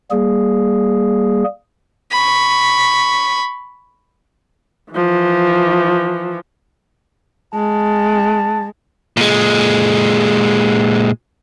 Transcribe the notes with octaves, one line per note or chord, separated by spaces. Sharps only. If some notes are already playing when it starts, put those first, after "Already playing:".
G3 A#3 G#4
B5 C#6
E3 F3
G#3 A5
A#2 G#3